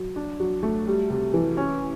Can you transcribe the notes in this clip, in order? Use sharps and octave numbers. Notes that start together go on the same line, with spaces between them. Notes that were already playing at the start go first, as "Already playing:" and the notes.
Already playing: F#3
D4
F#3
A3
G3
C3
E3
C#4